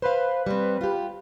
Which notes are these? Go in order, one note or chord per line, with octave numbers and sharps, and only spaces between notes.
B4 C5 F5
G3 C4
F4 G4